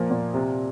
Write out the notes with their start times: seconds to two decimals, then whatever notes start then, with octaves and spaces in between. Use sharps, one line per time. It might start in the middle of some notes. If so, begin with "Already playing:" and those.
Already playing: A#2 F3 A#3
0.11 A#2
0.34 C3